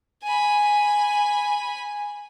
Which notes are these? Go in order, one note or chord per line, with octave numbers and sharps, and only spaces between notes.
G#5 B5